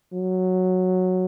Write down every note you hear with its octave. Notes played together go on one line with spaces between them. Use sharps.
F#3